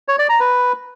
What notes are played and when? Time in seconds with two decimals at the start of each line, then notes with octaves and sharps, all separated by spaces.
0.08 C#5
0.19 D5
0.29 A#5
0.40 B4